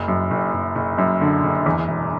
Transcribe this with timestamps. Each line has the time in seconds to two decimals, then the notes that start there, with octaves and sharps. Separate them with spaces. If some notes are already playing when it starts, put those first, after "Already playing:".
Already playing: F#1
0.08 F#2
0.31 F#1
0.53 F#1
0.75 F#1
0.98 F#2
1.21 D3
1.44 F#1
1.66 E2
1.88 E1